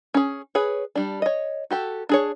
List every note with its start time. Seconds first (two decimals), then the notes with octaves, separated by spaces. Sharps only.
0.14 C#4 G#4
0.55 G#4 B4 C#5
0.95 G3 D4
1.22 C#5 D#5
1.71 F#4 G4 A4
2.09 D4 G#4 C#5